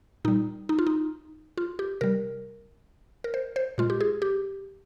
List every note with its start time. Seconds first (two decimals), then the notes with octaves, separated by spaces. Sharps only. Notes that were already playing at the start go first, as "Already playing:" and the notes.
0.25 A#2 G3 D#4
0.69 D#4
0.79 F4
0.87 D#4
1.57 F4
1.79 G4
2.01 C3 G3 A#4
3.24 A#4
3.34 C5
3.56 C5
3.78 A#2 G#3 F4
3.90 G4
4.01 G#4
4.22 G4